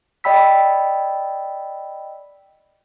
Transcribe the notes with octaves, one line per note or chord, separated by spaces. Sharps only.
D5 D#5 G5 B5 E6 B6